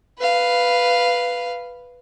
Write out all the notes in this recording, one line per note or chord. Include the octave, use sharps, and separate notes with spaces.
B4 F5